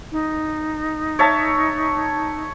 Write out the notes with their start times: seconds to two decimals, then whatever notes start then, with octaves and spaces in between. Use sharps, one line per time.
0.12 D#4
1.19 C#5 E5 A5